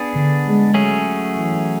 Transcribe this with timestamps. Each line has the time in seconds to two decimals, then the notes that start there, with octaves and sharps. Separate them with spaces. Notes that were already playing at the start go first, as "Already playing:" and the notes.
Already playing: B3 D4 G#4
0.13 D3
0.44 G#3
0.74 F#3 A3 C#4 G#4
1.36 E3